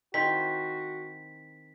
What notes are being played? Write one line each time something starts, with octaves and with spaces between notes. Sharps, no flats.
D#3 C4 E4 F#4 B6